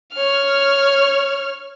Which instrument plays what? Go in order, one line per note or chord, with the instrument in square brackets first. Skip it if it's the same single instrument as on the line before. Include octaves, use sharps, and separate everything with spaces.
[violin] C#5 F6